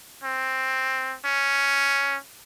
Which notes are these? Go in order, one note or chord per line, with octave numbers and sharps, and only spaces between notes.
C4
C#4